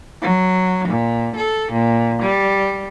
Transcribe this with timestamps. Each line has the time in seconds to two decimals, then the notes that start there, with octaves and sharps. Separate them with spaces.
0.22 F#3
0.88 A#2
1.36 A4
1.72 A#2
2.22 G3